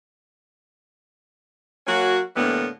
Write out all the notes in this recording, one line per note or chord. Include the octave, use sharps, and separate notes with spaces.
F#3 A#3 C#4 F#4
A2 D3 E3 G3 A#3 B3